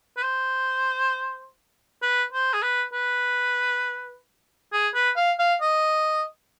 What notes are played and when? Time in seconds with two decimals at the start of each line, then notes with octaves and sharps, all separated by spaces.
0.17 B4
0.23 C5
2.02 B4
2.33 C5
2.54 G#4
2.63 B4
2.93 B4
4.73 G#4
4.95 B4
5.17 F5
5.39 F5
5.61 D#5